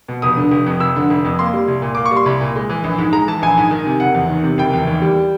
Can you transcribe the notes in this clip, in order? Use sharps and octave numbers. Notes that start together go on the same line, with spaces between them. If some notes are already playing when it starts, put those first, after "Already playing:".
B2
F1 D#6
D3
F1
F2
F1 E6
D3
F1
F2
A#3 C6
G3
C2
A#2
A#3 D6
C#6
G3
C6
C2 B5
A#2
G#3
E3
A#1
G#2
G#3 A#5
E3 A5
A#1 G#5
G#2
D#3
C3
F#1 F#5
E2
D#3
C3
F#1 G5
E2
D#2
G3